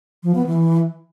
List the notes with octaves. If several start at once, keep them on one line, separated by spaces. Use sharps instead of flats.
F3
B3
E3